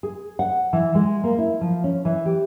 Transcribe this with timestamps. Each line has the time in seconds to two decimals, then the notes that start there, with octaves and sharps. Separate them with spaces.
0.03 G#4
0.39 F#5
0.73 E3
0.95 G#3
1.24 A#3
1.39 E4
1.61 F3
1.84 C#4
2.05 E3
2.25 G4